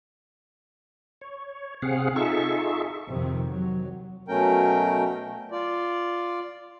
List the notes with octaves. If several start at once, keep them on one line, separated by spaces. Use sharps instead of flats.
C#5
C3 C4 G#4 F5 F#5
D#4 F4 G#4 A4 E5 C#6
F2 C3 D#3
F#3
B2 F#3 A3 C#4 A#4 G5
F4 D5